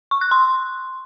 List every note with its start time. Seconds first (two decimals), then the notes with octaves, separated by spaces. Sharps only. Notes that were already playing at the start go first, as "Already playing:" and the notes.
0.11 C#6
0.21 F#6
0.31 C6